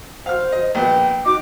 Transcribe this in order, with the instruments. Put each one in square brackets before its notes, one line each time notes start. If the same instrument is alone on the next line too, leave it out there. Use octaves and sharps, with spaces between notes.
[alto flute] C5 [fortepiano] F5 F6
[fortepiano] D#5
[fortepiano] A#1 B3 [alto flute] G5
[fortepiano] D#4 [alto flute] F#4 [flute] D6